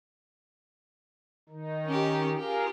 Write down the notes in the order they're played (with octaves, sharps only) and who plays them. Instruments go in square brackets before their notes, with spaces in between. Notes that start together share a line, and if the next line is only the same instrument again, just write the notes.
[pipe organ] D#3 D#4
[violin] C#4 G4
[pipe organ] F4 G#4 A#4 [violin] G4